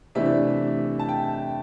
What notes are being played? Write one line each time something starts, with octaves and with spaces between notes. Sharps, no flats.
C3 E3 A3 D4 E5
A5
G5